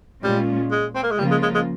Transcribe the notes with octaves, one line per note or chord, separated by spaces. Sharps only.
A#2 G3 G#3 C#4 F4
G#3
C4
A#3
G#3
C#3 F3 G3 A#3 F4
G#3
G#3
G#3